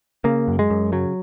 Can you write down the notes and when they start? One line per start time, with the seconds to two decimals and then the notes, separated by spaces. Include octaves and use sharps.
0.24 C#3 A#3
0.48 F#2
0.59 G#3
0.70 F#2
0.92 C#3 F#3